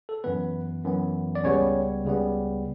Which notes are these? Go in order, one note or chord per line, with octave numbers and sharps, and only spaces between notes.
A4
F#2 E3 B3 B4
F#2 E3 B3
D5
C#2 C#3 G3 B3 C#4 C#5
C#2 C#3 G3 B3